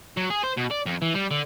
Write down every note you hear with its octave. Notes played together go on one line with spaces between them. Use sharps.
F#3
G#4
C5
B2
D5
F2
E3
G3
D3